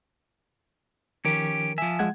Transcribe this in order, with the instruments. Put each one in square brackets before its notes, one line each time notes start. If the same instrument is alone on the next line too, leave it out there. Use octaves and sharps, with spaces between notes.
[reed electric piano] D#3 F3 A#4 [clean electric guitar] C#4 G4
[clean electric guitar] F3 E5 [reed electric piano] G#5
[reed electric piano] G#3 F#5 G#6